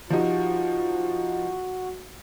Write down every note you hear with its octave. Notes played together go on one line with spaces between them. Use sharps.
F3 G3 D#4 F4 F#4